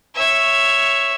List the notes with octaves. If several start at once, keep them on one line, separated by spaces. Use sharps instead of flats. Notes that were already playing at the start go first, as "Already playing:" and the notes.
C#5 E5